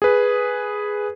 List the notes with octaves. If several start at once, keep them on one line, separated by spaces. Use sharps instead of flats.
G#4 B4